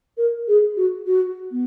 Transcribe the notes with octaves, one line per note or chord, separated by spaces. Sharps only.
A#4
G#4
F#4
F#4
B3